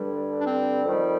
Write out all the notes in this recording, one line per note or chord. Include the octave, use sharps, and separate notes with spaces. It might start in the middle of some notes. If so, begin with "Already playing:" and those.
Already playing: G2 D3 G3
D4
C4
F2 D#3 G3